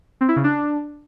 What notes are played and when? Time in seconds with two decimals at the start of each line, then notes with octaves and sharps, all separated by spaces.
0.21 C4
0.28 E4
0.36 C#3
0.44 D4